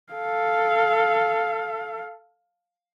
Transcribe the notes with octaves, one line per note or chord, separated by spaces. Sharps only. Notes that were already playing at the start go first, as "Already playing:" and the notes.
A4 F5